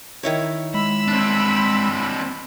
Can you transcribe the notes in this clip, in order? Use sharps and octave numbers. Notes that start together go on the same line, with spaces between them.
D#3 E4 C#5
G#3 B5 E6
C4 D4